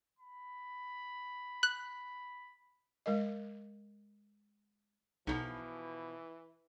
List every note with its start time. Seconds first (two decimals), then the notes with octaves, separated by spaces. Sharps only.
0.19 B5
1.63 F#6
3.06 G#3 A#4 D#5
5.27 B1 B2 D3 E3 F3 D#4